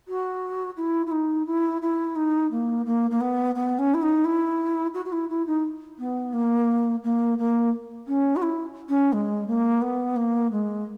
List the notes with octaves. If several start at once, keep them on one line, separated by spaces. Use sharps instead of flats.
F#4
E4
E4
D#4
E4
E4
D#4
A#3
A#3
A#3
B3
B3
C#4
E4
D#4
E4
F#4
F#4
E4
E4
D#4
B3
A#3
A#3
A#3
C#4
F#4
E4
C#4
G#3
A#3
B3
A#3
G#3